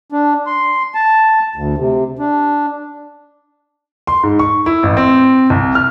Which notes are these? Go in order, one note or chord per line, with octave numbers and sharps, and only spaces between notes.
D4
C6
A5
D2
C3
D4
C6
G#2
C#6
E4
A1
C4
C2
F6